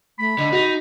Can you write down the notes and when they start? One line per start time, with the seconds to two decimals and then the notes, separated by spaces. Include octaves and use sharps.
0.19 A3 B5
0.39 D3 D#5
0.52 D#4 F#4